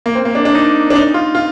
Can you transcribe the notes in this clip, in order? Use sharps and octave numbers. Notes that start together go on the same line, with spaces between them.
A#3
C4
A#3
D4
D4
D#4
D4
D#4
F4
F4